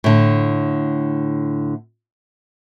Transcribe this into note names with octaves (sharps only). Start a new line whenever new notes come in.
A2 D3